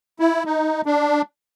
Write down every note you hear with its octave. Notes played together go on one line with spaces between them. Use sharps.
E4
D#4
D4